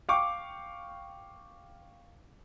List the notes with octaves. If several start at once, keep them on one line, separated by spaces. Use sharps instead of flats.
F5 G5 C#6 D6